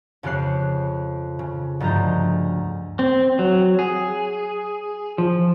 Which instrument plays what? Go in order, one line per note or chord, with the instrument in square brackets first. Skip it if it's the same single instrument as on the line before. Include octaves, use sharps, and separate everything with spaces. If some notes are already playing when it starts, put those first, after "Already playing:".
[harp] F2 C#3 G4 C#5 F#6 C7
C#3
D2 G2 F3 G#3 A#5 G6
[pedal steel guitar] C4
F#3
G#4
F3